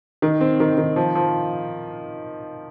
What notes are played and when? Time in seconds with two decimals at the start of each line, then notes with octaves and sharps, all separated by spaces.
0.22 D#3
0.41 C4
0.60 D#3
0.78 D#3
0.96 F3
1.15 F3